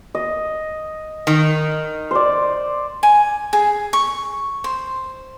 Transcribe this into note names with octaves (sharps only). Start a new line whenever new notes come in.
D#5
D#3
C5 D5
G#5
G#4
C#6
C5